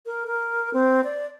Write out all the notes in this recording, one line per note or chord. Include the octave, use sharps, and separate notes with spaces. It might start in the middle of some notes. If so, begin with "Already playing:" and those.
A#4
A#4
C4
D5